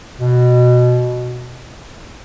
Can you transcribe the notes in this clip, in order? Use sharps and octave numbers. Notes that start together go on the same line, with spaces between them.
B2